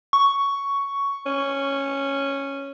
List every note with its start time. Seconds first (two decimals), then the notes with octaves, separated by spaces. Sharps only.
0.13 C#6
1.26 C#4